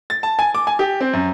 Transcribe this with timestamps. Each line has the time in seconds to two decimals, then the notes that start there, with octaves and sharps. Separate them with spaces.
0.10 A6
0.23 A5
0.39 G#5
0.55 D6
0.67 G#5
0.79 G4
1.00 C4
1.13 F#2